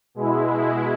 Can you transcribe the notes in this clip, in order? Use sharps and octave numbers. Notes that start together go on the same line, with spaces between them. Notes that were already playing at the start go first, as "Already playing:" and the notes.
B2 G#3 E4